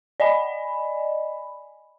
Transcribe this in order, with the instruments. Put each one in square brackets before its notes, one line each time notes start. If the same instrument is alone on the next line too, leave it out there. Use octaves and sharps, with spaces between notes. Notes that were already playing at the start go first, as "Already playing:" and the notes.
[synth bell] D5 D#5 G#5 B5